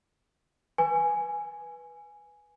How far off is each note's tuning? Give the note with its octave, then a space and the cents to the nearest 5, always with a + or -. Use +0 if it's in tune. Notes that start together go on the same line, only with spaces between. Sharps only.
B4 -10 G#5 +0